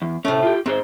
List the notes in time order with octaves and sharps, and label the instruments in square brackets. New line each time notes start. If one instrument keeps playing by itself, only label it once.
[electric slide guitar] E2
[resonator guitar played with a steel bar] A2 A3 [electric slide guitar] C3 C#4
[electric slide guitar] F4 G4
[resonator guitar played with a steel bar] G#2 [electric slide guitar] C4 G#4 C5